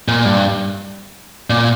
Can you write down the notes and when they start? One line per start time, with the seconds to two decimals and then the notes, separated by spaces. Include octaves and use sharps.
0.08 A#2
0.25 G2
1.50 A#2